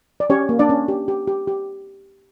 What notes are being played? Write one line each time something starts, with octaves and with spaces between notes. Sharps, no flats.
D5
C#4 G4 C#5
A#3
D4 D5
C#4
G4
G4
G4
G4